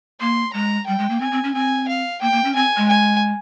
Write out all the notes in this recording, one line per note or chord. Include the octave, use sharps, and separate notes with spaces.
A#3 C6
G#3 A#5
G3 G5
G#3
A#3
C4 G#5
C4
C#4
C4 G#5
F5
A#3 G5
A#3
C#4
C4 G#5
G#3
G#5